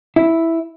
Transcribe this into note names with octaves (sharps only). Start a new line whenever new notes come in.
E4